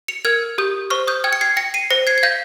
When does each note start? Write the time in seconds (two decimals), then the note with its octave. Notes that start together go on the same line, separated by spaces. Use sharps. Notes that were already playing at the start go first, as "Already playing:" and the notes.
0.08 C#7 F7
0.25 A#4 F6 G#6
0.58 G4 D#6 G6
0.90 C5 C#6 F6
1.08 D#6 G6
1.24 G5 F6 G#6
1.33 C#7
1.41 G#6 C7
1.57 G5 A#6 C#7
1.74 C7 D#7
1.91 C5 A#6 C#7
2.07 G#6 C7
2.18 G#6
2.23 F5 G6 A#6